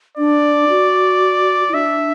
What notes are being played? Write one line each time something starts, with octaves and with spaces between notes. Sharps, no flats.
D4 D5
F#4
E4
D4 E5